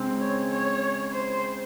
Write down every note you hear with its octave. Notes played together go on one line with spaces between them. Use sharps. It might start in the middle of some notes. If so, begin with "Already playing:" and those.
Already playing: C#3 G#3 C4
C#5
C#5
C5